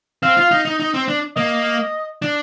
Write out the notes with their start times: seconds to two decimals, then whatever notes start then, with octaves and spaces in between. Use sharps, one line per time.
0.23 C4 F5
0.37 F4
0.51 D#4
0.65 D#4
0.80 D#4
0.94 C4
1.08 D4
1.36 A#3 D#5
2.22 D4